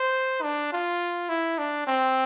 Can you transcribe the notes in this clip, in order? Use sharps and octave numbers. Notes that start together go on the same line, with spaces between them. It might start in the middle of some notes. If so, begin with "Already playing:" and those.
Already playing: C5
D4
F4
E4
D4
C4